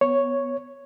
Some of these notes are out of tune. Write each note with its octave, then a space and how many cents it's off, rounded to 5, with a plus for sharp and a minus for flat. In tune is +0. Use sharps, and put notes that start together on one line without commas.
B3 +5 C#5 +0